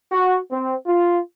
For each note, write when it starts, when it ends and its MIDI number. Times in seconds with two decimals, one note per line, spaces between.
0.12 0.38 66
0.51 0.75 60
0.86 1.19 65